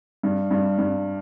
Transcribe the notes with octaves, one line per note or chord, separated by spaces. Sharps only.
G2
G2
G2